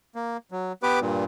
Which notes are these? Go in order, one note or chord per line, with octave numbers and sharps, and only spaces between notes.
A#3
F#3
B3 G4 B4 D6
G2 A#2